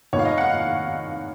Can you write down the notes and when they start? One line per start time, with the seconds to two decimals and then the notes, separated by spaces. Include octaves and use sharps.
0.13 F1 D#2 D#3 C#5
0.19 F5
0.25 D#5
0.38 F#5
0.50 F5